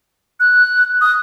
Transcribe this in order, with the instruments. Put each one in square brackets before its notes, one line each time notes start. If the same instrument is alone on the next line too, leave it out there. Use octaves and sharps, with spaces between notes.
[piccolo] F#6
D#6